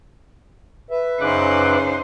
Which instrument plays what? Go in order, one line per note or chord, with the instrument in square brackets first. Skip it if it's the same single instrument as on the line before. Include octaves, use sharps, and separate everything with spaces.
[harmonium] B4 E5
[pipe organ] F#2 D6 F#6 [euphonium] C#3 [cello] D#4 C5